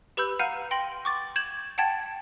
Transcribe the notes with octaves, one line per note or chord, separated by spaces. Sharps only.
G4 B4 B5 E6 G6
F5 F#5 A#5 F6 G6 D#7
G5 C6 A#6 D7 F#7
C#6 D6 A6
G6 G#6 E7 F#7
F#5 G5 A5 G#6 A6